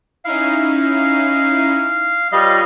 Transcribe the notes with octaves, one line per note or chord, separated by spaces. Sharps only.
C#4 D#4 E4 F5
G3 F4 B4 C#5 D#5 F5